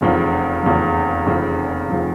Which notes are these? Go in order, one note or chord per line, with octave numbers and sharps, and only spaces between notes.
F1 E2 C#3 F3
F1 E2 C#3 F3
F1 E2 C#3 F3
F1 C#3 F3